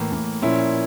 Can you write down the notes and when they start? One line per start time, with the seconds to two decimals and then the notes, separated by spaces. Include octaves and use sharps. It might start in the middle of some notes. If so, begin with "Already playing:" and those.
Already playing: A2 E3 A#3
0.12 A2 E3 A#3
0.42 A#2 F3 A#3 C#4 E4